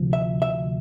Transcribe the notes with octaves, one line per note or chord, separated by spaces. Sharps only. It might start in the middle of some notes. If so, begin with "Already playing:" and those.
Already playing: D2 C3 F3
E5
E5